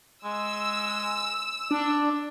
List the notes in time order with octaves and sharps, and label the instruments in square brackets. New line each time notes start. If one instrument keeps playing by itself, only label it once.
[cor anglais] G#3 [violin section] E6
[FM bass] D4 [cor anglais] D5